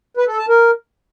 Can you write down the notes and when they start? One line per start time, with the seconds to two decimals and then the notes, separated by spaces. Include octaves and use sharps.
0.17 B4
0.28 A4
0.38 A5
0.49 A#4